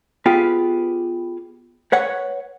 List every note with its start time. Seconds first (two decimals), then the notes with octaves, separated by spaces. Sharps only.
0.26 B3 F4 G4 G#4 B4
1.92 B4 C#5 F#5